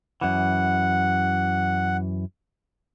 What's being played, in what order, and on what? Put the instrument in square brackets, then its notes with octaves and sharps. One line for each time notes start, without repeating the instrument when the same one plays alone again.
[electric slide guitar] F#2 E3 [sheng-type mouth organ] F#5